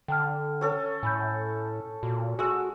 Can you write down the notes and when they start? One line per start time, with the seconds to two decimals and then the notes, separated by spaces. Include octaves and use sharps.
0.08 D3 G5 A5 F6
0.61 C#4 A4 C#5
1.03 A2 G#5 B5 G6
2.03 A#2 F#4
2.39 G#3 F#4 G#5 E6